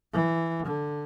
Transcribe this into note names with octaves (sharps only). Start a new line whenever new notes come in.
E3
D3